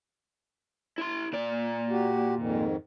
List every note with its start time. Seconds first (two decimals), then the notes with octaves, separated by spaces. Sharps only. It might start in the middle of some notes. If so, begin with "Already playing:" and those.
0.98 E4 C6
1.33 A#2 D5
1.90 F#4 G4
2.35 F2 G#2 D#3